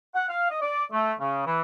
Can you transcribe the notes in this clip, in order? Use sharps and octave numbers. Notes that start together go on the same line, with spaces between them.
F#5
F5
D#5
D5
A3
C#3
E3